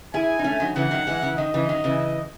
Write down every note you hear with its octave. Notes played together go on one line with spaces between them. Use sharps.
E4 G#4 G#5
D#4
A3 C#4
D#3 F#3
C#3 E3 F#5
D#3 F#3
E3 G#3
C#3 E3
D#3 D#5
C#3 E3
D#3 F#3
C#3 E3